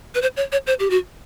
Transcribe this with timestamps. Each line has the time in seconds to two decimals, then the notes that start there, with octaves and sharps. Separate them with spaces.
0.15 B4
0.22 C5
0.37 C#5
0.52 C#5
0.67 C5
0.80 G4
0.90 F#4